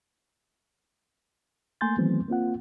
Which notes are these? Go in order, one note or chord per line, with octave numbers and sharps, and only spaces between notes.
A3 A#3 G#5 C6 G6 A6
D#3 E3 F#3 A3 B3 C4
A#3 C4 F4 F#5